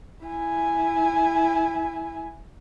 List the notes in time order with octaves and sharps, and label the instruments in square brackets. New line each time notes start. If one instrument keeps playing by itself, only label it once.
[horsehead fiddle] E4 G#5